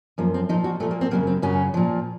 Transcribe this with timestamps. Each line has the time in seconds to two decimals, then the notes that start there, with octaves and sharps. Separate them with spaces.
0.18 F#2 F3 A#3
0.34 C4
0.49 A#2 F3 D#4
0.64 F#4
0.80 A#2 F3 A3
0.91 A#3
1.01 C4
1.11 F#2 C#3 F#3 A#3
1.27 C4
1.42 F#2 C#3 F#3 C#4
1.74 A#2 F3